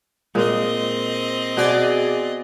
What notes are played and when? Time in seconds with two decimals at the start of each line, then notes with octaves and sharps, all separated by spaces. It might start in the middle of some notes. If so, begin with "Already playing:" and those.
0.35 A#2 G#3 C4 D#5
1.57 B2 G#4 D5 G#5